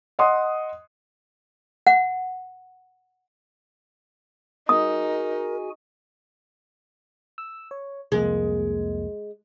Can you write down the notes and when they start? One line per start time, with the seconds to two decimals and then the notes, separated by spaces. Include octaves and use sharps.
0.19 D#5 F#5 C6 D#6
1.87 F#5
4.69 D#4 F#4 G#4 A#4 G#5 D#6
7.38 E6
7.71 C#5
8.12 C2 F2 G#3 A#3